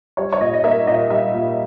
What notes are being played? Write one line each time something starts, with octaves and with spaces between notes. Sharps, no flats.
G3 C#5
C#5
A#2 D#5
D#5
A#3 E5
A#2 D#5
G3 E5
A#2